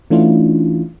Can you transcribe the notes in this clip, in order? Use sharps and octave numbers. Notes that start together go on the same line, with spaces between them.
E3 A3 C#4 D4 E4 F4